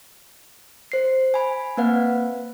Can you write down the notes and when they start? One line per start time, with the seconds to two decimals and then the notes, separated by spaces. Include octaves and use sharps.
0.92 C5 C7
1.34 G#5 B5
1.77 A#3 C4 B4 F5 F#5